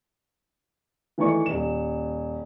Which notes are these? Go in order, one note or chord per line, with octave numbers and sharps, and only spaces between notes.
D#3 E3 A3 D#4 D5 C#6
D#1 E7